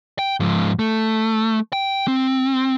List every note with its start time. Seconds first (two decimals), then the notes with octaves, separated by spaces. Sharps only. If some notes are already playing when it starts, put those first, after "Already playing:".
0.19 G5
0.40 G#2 F3
0.79 A3
1.73 G5
2.08 C4